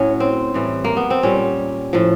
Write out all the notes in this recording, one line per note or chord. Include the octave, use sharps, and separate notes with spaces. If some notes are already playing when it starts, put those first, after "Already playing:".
Already playing: A2 F#3 C#4
C4
A2 E3 G3
A#3
B3
C4
A#2 G3 C#4
A2 F3